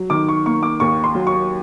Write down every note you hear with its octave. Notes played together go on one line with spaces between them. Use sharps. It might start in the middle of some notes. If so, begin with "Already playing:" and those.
Already playing: F#3
D#3 D6
C#6
A#3 C#6
D6
D#2 C#6
C6
F#3
C#6